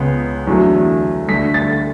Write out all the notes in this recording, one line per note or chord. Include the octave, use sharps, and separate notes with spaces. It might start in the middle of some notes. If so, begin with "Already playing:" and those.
Already playing: C#2 C#3 G#3 B3
E2 D3 F#3 A3
D2 D3 A3 B6
A6